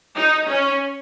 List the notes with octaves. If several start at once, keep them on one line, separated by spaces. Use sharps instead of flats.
D#4
C#4